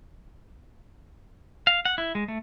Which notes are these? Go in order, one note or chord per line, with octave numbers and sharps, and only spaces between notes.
F5
F#5
E4
G#3
A3